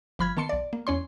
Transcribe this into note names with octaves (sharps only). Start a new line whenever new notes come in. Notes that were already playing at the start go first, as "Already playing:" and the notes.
G1 F3 B5 F6 G#6
D#3 B3 A5 C6 C#7
B1 D5
A#3
E2 C#4 C#5 C6